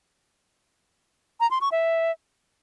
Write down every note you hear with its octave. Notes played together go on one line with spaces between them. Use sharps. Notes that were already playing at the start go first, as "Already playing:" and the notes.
A#5
C6
C#6
E5